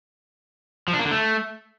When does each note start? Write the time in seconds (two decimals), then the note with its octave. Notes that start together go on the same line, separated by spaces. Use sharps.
0.88 F3
0.94 D4
0.99 A#3
1.05 D3
1.11 A3